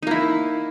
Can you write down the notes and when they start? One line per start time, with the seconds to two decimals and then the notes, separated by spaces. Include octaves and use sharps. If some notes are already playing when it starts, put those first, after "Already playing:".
0.03 D#4
0.07 A#3
0.11 E4